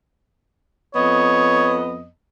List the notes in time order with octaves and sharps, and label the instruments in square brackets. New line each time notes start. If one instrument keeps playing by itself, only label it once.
[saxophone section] F2 B3 D#5 [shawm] C#5